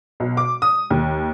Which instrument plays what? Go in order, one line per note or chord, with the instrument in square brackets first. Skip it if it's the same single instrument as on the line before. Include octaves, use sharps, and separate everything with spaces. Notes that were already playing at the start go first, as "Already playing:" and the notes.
[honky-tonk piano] B1
D6
D#6
D#2